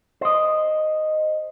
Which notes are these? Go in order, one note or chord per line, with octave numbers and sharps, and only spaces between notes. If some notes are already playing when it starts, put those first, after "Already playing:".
C5 D#5